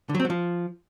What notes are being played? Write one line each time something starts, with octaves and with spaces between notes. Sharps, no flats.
D3
F#3
C4
F#3
F3